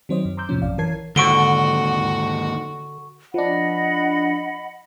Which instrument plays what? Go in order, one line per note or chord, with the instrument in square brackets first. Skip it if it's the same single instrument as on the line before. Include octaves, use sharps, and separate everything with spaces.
[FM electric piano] D#3 F#3 C4 C5 C#5 D#5
F#2
A#5 C6 D6 E6 G6
F2 A2 C3 F3 C#4
A#1 F#2 D5 F5
E3 A#4 C#5 A5 G#6 C7
[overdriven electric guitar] D#2 G#2 [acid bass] D3 [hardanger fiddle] F#4 [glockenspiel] C#6 D7 G7
[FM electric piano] F3 D4 [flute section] D#5 F#5 B5